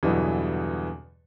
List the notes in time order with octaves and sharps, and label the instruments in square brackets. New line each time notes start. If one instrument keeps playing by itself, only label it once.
[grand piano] E2 G2 B2 D3 E3 F#3